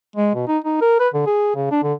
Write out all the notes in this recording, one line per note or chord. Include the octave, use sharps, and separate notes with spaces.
G#3
B2
D#4
D#4
A#4
B4
D3
G#4
C#3
D4
D3